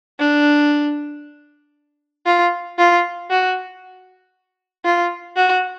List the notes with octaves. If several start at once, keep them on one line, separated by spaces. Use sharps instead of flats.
D4
F4
F4
F#4
F4
F#4